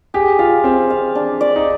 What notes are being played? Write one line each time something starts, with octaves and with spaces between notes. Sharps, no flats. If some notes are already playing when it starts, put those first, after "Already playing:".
G4 G#4
F4 F5
C4 F5
F5
D4
D5
D#4